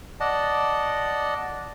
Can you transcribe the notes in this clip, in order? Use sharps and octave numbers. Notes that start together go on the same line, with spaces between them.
D5 D#5 F#5 A5